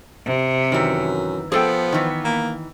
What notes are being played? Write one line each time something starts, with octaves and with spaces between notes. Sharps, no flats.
C3
F#2 D#3 E3
F3 B3 G#4 A4 G5
D#3 E3
A#3